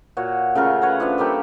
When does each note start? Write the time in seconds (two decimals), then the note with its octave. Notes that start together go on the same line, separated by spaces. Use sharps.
0.17 A#2 F#4 C#5
0.55 C#3 A3 F4 A#4
0.81 B4 C#5 E5 F#5
1.00 F3 D4 B4 E5
1.18 G3 A3 A#3 G4